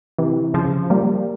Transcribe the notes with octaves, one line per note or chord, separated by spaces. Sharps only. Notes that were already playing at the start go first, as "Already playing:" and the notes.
C3 E3
C#3 F3
G3 A#3